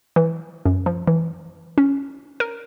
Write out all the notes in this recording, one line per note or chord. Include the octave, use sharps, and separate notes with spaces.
E3
F#2
F3
E3
C#4
A#4